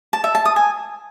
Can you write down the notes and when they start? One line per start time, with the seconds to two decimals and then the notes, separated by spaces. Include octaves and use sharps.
0.13 A5
0.24 E5
0.35 A5
0.45 D#6
0.56 G#5